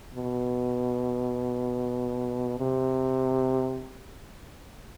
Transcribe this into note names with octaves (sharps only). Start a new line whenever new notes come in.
B2
C3